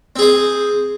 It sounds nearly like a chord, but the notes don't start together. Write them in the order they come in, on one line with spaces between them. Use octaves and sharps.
C4 G#4 C5